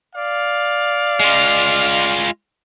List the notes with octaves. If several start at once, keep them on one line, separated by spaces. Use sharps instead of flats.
D5 F5
G#3 F4